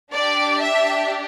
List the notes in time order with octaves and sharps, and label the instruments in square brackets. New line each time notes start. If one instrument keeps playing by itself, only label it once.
[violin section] D4 G4 D5
E5